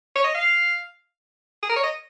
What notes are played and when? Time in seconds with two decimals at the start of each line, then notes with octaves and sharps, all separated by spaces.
0.16 C#5
0.24 D#5
0.35 F5
1.63 G#4
1.70 A#4
1.76 C#5
1.84 D#5